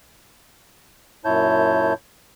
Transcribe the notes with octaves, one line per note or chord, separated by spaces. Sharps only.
F#2 A#2 E4 C#5 A5 G6